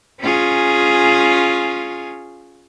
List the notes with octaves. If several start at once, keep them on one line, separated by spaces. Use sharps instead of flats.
C#4 F4 G#4